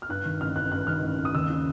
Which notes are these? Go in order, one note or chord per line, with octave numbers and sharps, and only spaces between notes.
F6
G2 F#6
D#3
A1 F6
A1 F#6
G2 F#6
D#3 F6
A1
A1
D#6
D#2 E6
C#3